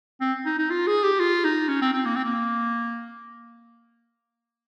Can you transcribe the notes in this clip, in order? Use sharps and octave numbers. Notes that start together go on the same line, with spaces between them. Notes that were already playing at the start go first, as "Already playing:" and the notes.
C4
D#4
D#4
F4
G#4
G4
F4
D#4
C#4
C4
C4
A#3
C4
A#3